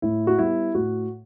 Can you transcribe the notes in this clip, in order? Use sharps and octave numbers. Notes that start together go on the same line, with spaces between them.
A2 E4
F#4
G3 B3 E4
A2 F#4